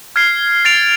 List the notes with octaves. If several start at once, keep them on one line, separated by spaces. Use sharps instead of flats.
F6 G#6 C7
A6 D7 F7